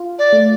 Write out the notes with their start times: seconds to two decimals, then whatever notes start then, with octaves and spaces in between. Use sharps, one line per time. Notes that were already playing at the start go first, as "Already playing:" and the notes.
Already playing: F4
0.19 D5
0.33 A3